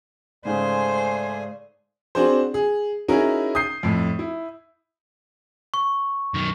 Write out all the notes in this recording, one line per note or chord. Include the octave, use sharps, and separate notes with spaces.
G#2 C#3 A3 G#4 C5 D5 G#5
C4 D4 F#4 G#4 C5
G#4
C#4 D#4 E4 F#4 G#4 A#4
D#6 G6 C7
F2 A2
E4
C#6
F#2 D#3